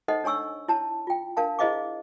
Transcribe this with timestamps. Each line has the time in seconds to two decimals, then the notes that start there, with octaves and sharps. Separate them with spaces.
0.08 D#4 A4 C5 D#5 F#5
0.24 D4 C#5 G#5 C#6 E6
0.68 E4 C#5 A5
1.07 F4 G5
1.37 D4 A#4 F5 A5
1.59 E4 G#4 C5 D#5 F5 D6